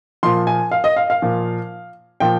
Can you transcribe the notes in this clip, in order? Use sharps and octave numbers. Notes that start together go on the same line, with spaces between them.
A#2 F3 C6
G#5
F5
D#5
F5
F5
A#2 F3
A#2 F3 G5